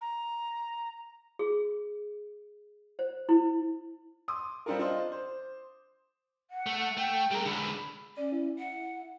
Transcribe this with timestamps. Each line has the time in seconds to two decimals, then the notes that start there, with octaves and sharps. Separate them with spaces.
0.01 A#5
1.39 G#4
2.99 C5
3.29 E4
4.28 C6 D6 D#6
4.66 G3 C4 D4 F4 A4 A#4
4.79 D4 F4 C5 D#5
5.12 C5
6.50 F#5
6.66 A3
6.97 A3 G5
7.31 G3 G#4 A#4
7.46 D3 G#3 B5
8.17 C#4 D5
8.32 E4
8.59 F#5